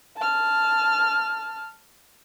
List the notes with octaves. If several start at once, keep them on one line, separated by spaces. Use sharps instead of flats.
A5 F6